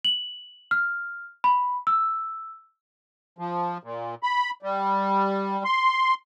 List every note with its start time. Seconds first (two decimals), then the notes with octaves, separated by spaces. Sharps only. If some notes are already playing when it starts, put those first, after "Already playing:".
0.05 F#7
0.71 F6
1.44 B5
1.87 E6
3.38 F3
3.83 A#2
4.23 B5
4.63 G3
5.65 C6